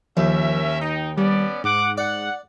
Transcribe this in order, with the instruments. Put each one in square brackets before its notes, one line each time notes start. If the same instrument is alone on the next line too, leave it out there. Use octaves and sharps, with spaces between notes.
[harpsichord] D#2 [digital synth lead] F3 [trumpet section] C#4 A#4 E5
[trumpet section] D#4 [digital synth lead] G5
[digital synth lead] G3 [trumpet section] B3 C#4 D5
[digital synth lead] G#2 [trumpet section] F#5 D6
[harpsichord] D5 [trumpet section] F#5